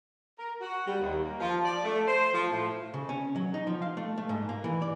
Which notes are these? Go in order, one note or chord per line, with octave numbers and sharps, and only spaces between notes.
A#4
F#4
G3
D#2
A#3
F3
D5
A3
C5
F3
A2
C#3
C#4
F#3
D#4
F3
F5
A3
A3
G#2
A#3
E3
D5